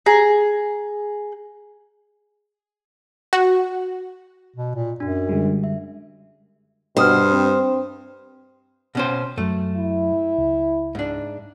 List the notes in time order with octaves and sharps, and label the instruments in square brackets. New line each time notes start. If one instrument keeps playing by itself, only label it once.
[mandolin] G#4 A#5
[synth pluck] F#4
[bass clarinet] B2
A#2
[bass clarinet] F#2 [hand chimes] D4 F#4
[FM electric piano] D3 G3 G#3
[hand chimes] E5
[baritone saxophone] G2 [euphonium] B2 [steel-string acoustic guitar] C5 [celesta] G5 D#6 F6
[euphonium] C4
[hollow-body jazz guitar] B2 C#4 C5
[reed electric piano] F#2 F#3 [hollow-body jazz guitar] A3
[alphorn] E4
[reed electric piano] C#2
[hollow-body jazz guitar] G#2 D4